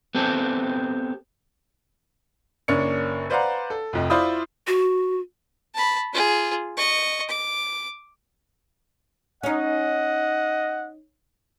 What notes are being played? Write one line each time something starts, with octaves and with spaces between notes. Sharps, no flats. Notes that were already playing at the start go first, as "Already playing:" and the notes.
B3 C4 G4 A4
F#1 A#3 C#4 D4 C#7
B4 C5 D5 F5 F#5 A#5
A4
F1 F2 D#5
E4 F4 C5 D5 B5 D#6
F#4
A5 B5
F4 G#4
D#5 C#6
D6
C#4 D#4 D#5 F#5